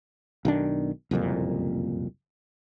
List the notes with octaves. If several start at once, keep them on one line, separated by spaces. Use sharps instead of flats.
B1 D#3 D4
F#1 C2 F2 A#2